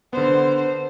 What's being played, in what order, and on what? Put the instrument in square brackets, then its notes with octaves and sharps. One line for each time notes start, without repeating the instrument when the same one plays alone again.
[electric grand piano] D3 B3 [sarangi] C5